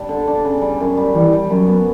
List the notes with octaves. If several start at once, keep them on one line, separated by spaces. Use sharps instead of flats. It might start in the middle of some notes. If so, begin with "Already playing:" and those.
Already playing: G3 D4
D3
D4
C#3
G3
F#2
G3
E3 G3
G3
F#2 F#3
B3